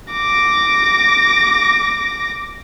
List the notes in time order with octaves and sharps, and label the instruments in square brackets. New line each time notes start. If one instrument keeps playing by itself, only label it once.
[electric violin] D6 A#6